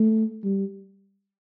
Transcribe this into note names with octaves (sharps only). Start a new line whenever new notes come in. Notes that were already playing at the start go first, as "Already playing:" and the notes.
Already playing: A3
G3